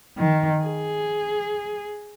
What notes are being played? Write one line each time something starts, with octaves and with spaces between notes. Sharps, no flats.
D#3
G#4